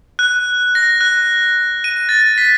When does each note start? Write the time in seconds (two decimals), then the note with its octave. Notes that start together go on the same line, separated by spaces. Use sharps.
0.19 F#6
0.75 A#6
1.01 F#6
1.84 D#7
2.09 A6
2.38 B6